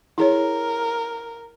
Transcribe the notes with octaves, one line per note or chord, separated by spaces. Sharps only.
E4 G#4 A#4 C#5